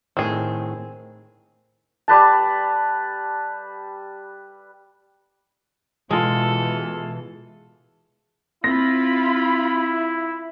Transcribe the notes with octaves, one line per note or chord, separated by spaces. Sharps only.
A2 D#3 C4 G#4
G3 B4 A5
B2 E3 G#3 F4 G#4 A4
C4 E4 F4 B5 A#6